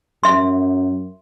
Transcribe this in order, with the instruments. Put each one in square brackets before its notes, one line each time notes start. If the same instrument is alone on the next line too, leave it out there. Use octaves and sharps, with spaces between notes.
[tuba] F#2 [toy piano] E5 C6